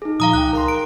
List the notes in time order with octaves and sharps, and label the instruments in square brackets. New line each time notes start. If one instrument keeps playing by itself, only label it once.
[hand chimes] D#4 G#4
[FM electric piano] A#2 F3 [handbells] F5 A#5 D#6
[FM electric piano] C#2 G5 [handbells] F#6
[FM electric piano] A#4 A#5 C6
[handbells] D7